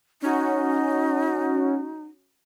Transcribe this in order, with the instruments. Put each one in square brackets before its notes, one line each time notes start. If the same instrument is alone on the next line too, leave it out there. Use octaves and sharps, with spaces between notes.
[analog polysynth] C#4 F#4 [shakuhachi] D#4